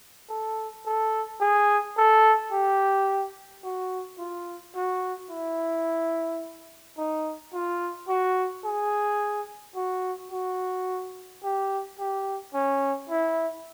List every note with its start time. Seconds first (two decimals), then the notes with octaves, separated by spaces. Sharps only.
0.29 A4
0.86 A4
1.40 G#4
1.97 A4
2.52 G4
3.64 F#4
4.19 F4
4.75 F#4
5.30 E4
6.98 D#4
7.54 F4
8.08 F#4
8.64 G#4
9.75 F#4
10.31 F#4
11.43 G4
11.99 G4
12.54 C#4
13.09 E4